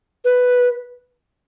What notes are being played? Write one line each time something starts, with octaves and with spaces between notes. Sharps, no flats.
B4